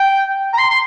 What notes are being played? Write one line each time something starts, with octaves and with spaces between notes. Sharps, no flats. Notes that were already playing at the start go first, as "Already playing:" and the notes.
Already playing: G5
A#5
C6
C6